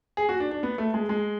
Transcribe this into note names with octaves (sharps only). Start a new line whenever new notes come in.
G#4
F#4
D4
D4
B3
A3
G#3
G#3